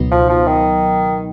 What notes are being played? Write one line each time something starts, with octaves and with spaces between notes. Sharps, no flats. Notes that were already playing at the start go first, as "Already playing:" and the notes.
Already playing: C#2 B2 F#3 B3 D#4
F3
F3
D#3